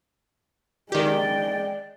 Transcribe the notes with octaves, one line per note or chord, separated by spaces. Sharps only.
D#3 G#3 G4 D5 G5